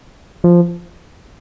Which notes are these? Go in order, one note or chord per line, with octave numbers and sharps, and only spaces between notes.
F3